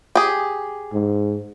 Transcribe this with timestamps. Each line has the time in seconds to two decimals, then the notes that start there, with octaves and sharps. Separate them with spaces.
0.15 G4 G#4
0.93 G#2